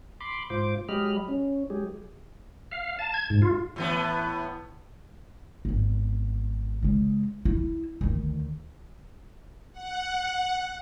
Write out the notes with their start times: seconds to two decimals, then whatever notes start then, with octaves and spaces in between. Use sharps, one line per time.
0.21 B5 C6 D6
0.50 G#2 F4 C5 D6
0.89 F#3 G#3 G4 D#5 B5 F6
1.28 C#4
1.70 F#3 G#3 G4 G#4
2.71 F5
2.99 A5
3.14 G#6
3.30 G#2
3.42 F4
3.76 A2 E3 B3
5.65 G#1 B3
6.83 C#3 G#3
7.45 E4
8.01 D2 D#3
9.73 F#5